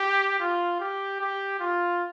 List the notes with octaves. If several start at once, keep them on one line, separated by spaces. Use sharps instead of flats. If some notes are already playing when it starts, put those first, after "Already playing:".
Already playing: G4
F4
G4
G4
F4